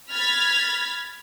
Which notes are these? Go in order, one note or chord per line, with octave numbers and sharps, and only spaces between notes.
B5 F6 G#6 A6 B6